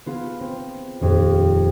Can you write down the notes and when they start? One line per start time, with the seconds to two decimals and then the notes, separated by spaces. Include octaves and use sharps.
0.06 B3 F4 G#4
0.40 C4
1.01 D#1 F2 G4